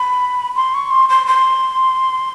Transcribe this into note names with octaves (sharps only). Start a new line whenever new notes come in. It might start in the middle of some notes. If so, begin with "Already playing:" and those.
Already playing: B5
C6
C#6
C6
C6
C6